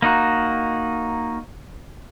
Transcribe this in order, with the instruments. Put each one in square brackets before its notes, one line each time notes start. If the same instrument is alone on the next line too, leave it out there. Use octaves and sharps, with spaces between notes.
[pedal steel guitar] A#3 D#4 F#4